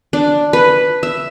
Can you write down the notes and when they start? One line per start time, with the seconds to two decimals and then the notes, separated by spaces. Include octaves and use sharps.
0.13 D4
0.53 B4
1.03 E5